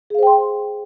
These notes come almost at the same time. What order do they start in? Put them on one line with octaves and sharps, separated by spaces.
G#4 F5 C5 G5 C6